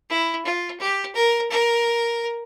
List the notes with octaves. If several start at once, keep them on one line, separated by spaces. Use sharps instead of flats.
E4
F4
G4
A#4
A#4